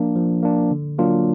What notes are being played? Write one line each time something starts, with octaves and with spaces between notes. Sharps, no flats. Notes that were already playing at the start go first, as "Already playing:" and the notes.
Already playing: F3 A#3 D4
F3
A#3 D4
D3
F#3 A#3 D4 F4